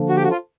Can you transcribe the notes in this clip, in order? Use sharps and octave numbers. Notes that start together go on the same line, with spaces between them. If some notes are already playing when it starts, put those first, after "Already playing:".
Already playing: D3 F3 A#3 D4
F#4
G4
F#4
F4